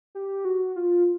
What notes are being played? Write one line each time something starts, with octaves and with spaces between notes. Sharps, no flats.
G4
F#4
F4